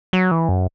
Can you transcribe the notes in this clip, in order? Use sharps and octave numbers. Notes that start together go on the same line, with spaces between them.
F#3
E3
F#2